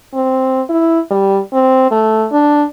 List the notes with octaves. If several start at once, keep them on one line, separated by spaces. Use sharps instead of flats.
C4
E4
G3
C4
A3
D4